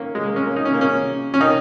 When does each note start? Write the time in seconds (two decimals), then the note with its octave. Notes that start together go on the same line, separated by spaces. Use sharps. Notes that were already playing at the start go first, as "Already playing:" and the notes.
Already playing: G#2 D#3 A#3 C#4
0.15 G#3
0.25 A#3
0.36 C#4
0.46 A#3
0.56 D#4
0.65 C#4
0.73 A#3
0.81 C#4
1.34 C#4
1.41 D#3 D#4